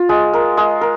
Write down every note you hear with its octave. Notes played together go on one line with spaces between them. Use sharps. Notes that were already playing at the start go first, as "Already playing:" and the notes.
Already playing: F4
G#3
A#4
G#3
A#4